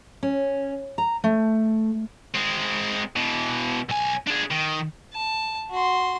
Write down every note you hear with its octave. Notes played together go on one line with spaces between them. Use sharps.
C#4
A#5
A3
G#3 C4
B2 E3
B1 G#5
D4 G#4
D#3
A5
F#4 C6